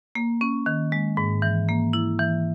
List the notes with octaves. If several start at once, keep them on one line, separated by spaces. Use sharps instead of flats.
A#3
C#4
D#3
G#3
G#2
E3
A#3
E4
E3